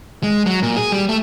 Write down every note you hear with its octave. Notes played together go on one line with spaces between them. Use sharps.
G#3
F#3
A#2
G#4
G3
A3